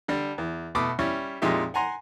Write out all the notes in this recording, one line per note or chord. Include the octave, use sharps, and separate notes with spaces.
D3 G3 D4
E2
B2 A3 B5 D6 D#6
G3 C#4 E4
F2 A#2 G#3 D#4 G4 E5
F#5 G#5 A#5 C6